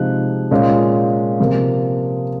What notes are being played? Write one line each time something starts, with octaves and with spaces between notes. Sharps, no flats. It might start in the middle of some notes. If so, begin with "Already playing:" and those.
Already playing: C3 F3 G#3 D#4 F#6
A#2 G#3 C#4 F4
C3 F3 A#3